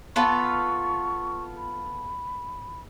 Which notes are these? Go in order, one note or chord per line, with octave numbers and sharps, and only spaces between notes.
B3 F4 A4 C#6
B5